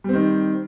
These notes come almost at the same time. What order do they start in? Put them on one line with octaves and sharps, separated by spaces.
G3 C4 D#3